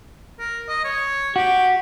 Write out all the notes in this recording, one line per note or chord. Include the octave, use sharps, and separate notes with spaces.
A#4
D#5
C#5
F#4 G4